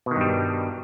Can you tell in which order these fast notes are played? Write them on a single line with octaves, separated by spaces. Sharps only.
B2 D#3 G2 G3